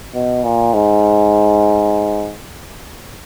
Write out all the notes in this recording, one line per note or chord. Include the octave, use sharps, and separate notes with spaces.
B2
A#2
G#2